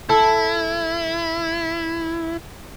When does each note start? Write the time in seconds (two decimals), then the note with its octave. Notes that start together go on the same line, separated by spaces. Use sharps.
0.09 E4 A4